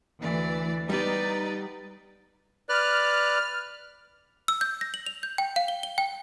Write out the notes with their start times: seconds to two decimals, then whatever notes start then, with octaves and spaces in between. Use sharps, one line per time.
0.22 D2 E3 D5
0.90 G3 B3 D#4 G4 B4 D5
2.69 B4 D5 F6 F#6
4.48 E6
4.61 G6
4.81 A#6
4.94 F#7
5.06 F7
5.23 G6
5.38 G5
5.56 F5
5.68 G7
5.83 G7
5.98 G5